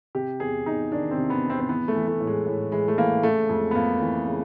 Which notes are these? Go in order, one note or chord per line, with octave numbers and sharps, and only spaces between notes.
C3 G4
E2 G#4
E2 D#4
D#3 D4
C4
C3
B3
E2
C4
C4
E3 B3
A3
E3
A3
A2
G#3
A2
E3 G#3
A3
E3 A#3
C#3 A3
F2 G#3
B3
F2 A#3
E3
C#3